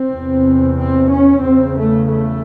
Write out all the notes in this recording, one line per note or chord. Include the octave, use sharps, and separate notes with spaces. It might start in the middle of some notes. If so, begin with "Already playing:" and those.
Already playing: C4
E2 C3
C4
C#4
E2 C#3 C4
A3
A3